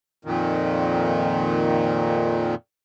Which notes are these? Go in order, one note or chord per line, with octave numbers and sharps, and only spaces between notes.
F2 A#2 D#3